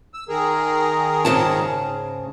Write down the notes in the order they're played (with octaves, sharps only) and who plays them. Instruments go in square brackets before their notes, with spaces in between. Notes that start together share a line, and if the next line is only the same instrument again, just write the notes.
[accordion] E6
D#3 G#4 A#4
[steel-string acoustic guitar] G#2 C#3 A5